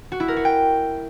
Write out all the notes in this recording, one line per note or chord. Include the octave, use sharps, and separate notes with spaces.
F#4
E4
A#4
F#4
G5